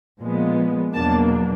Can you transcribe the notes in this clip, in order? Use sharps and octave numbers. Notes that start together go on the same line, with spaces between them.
A#2 F3 G#3 B3
E2 B2 F#3 A#3 D4 A5